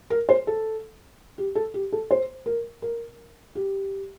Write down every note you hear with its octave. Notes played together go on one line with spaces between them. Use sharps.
A#4
C5
A4
G4
A4
G4
A4
C5
A#4
A#4
G4